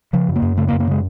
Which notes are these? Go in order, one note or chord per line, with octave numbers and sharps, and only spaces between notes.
C#3 F3
F#2
A#3
F#2
C#3 A3
A#3
F#2
A#3
C#3 G#3